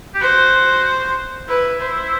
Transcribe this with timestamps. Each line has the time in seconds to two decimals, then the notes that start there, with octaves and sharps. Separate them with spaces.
0.14 G4
0.21 F#4 C5
1.49 E4 B4
1.81 C5